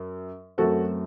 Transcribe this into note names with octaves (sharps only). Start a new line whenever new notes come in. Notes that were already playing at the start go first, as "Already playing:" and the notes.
Already playing: F#2
F#2 F#3 A3 C4 F#4 A4